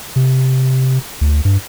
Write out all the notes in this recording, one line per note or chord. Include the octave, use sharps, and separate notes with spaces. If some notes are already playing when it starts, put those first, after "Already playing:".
C3
D2
G2